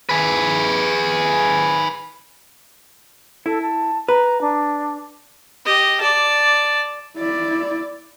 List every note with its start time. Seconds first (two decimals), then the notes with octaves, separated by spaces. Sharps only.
0.09 G#4 B4
3.46 E4 A4
3.62 A5
4.09 B4 A#5
4.41 D4
5.65 G4 D#5
6.01 D5 A5
7.17 E4 D5